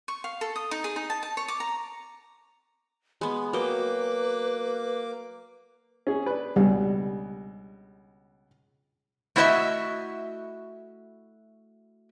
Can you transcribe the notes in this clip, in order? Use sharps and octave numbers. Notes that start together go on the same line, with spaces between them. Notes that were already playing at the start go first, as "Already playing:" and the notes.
C#6
F5
A4
D#6
D#4
G#4
D#4
A5
A5
C#5
D6
A#5
G#3 B3 B5
F#3 A#3 B4 G5 D6
C#4 G#4
D4 B4
C#2 B2 G3
A3 E4 F#4 C#5 D#5 E5